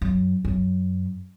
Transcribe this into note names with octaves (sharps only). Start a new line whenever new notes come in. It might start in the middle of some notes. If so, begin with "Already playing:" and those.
F#2
F#2